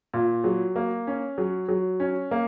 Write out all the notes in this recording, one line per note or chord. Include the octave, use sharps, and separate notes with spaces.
A#2
F#3
A#3
C#4
F#3
F#3
C#4
A#3